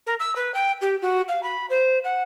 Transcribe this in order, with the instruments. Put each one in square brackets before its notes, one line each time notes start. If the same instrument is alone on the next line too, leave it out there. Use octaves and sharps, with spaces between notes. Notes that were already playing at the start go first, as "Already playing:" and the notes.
[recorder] A#4
E6
B4
G5
G4
F#4
F5
B5
C5
F#5